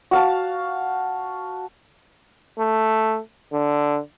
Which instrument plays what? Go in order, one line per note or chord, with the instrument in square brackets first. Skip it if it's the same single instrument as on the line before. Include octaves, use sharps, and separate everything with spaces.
[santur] F#4 F5 A5
[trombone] A3
D3